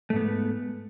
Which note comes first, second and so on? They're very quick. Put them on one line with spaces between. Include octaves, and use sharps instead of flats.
A3 G#2 B3